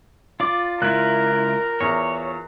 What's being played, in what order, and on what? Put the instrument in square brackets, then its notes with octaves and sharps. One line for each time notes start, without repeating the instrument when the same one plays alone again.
[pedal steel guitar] F4 D5 [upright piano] D6
[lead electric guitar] C#2 E4 [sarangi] A#4 [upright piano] F#6
[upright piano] E2 [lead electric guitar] C#5